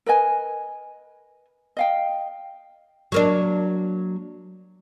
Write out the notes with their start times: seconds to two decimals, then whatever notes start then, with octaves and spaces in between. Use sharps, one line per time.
0.06 A#4 B4 D#5 G#5
1.77 D#5 F5 G5
3.12 F#3 A#3 D4